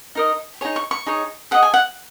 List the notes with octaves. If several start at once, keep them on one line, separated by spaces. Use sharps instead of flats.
D#4 A#4 D#5
D#4 G#4 C#5
C#6
C#6
D#4 G#4 C#5
G#4 D#5 F#5
G#5
F#5